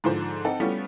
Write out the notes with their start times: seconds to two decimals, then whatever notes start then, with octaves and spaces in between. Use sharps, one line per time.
0.04 G#2 D3 F3 C5
0.45 C4 D#4 A4 F#5
0.60 G3 A3 B3 C#4 F4